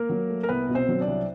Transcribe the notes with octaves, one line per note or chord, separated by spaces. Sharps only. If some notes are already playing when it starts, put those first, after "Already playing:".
Already playing: A#3 A#4
F#3
A3
A#4
C2 B3 B4
B2
C4 C5
F#3
D4 D5
C2